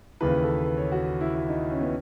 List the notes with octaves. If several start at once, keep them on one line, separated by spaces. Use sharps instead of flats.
D#2 C#3 E3 B4
A4
B4
C#5
F#4
E4
E4
D#4
C#4
B3